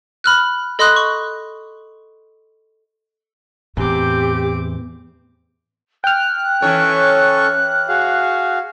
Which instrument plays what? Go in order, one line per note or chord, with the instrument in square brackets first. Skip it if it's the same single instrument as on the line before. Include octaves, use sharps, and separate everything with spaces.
[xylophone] B5 F6 F#6
A4 D#5 B5 C6 D#6 F#6
C#6
[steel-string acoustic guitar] E2 [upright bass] A2 [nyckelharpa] C4 D6 [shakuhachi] G4
[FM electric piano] G5 F6 [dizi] F#6
[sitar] E3 C#5 [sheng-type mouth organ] C#4 A4 C#6
[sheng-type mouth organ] F#4 G#4 F5